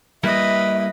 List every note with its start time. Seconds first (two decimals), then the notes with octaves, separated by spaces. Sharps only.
0.24 G3 A#3 E4 B4 D#5 E5